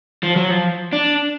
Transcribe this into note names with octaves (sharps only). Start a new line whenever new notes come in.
F3
F#3
F3
D4